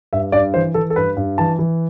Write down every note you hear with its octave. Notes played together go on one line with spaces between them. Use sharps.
G2 E5
G2 D5
E3 C5
E3 A4
A4
G2 B4
G2
E3 A5
E3